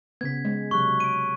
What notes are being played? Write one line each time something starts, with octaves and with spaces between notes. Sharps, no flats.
C#3 B3 G#6 B6
G#3
C3 F#3 C#6 F#6
D7 D#7